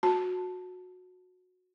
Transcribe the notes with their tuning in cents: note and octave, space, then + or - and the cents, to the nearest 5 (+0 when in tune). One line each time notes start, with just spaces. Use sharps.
F#4 -20 A5 +0